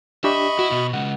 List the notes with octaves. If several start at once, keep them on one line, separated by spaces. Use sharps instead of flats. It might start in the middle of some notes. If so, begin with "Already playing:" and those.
D4 G4 D#5 E5 B5 C#6
E4 F#4
B2
C#3 G#3 F#5